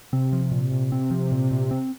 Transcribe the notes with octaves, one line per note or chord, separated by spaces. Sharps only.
C3 C4
F3
A#2
A#2
C4
F3
A#2
A#2
C4